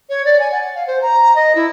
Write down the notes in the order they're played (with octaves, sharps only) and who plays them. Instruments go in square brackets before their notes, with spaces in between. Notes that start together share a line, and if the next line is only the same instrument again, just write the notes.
[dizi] C#5
D5
G#5
F#5
F5
C5
A#5
D#5
E4